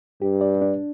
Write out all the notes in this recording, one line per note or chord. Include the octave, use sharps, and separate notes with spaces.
G2 G4
D5
D4